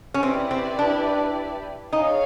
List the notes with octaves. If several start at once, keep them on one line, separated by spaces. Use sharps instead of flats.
C#4
C4 E4 G4 B4 D5
C4
D4
D#4 G#4 C#5 F5 G#5